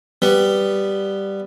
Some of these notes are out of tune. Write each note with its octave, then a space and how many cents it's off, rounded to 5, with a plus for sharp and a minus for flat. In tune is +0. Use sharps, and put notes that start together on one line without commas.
G3 +0 B3 +0